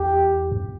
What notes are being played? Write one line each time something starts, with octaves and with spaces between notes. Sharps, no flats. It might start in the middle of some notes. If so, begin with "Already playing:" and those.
Already playing: E2 G4
F2